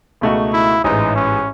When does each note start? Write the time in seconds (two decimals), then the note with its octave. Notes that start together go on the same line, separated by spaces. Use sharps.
0.21 C#2 B2 A3 D#4 F#4
0.53 E4
0.84 A1 G#2 E3 D#4
1.16 C#4